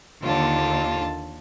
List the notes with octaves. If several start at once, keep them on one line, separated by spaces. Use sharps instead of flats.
D#2 D3 F4 A5